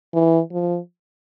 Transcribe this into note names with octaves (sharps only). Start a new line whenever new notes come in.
E3
F3